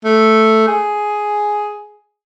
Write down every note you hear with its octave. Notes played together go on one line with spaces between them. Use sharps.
A3
G#4